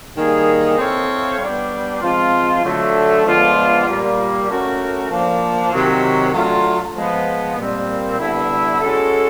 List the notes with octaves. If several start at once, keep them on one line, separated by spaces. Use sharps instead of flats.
D#3 G3 A#3 D#4 G#4
C4 E4 A4 C#5 F5
G3 B3 D4 G4
F3 G#3 C4 F4
D3 F#3 A3
F3 G#3 B3 D4 F4
A#2 G3 A#3
A3 C#4 F#4 A#4
F3 A#3 D4
C3 D#3 F#3
F#3 A3 D4 F4
F3 G#3 B3
A#2 G3 C4
D3 G3 B3 E4
G#3 C#4 F#4 A4